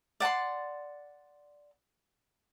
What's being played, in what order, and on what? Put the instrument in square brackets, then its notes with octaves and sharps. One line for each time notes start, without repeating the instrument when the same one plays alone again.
[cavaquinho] D5 F#5 A5 C6